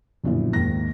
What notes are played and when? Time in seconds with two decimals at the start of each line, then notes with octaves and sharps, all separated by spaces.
0.24 B1 F#2 A#2 D3 E3 F3
0.53 D#2 G#2 D#3 A#6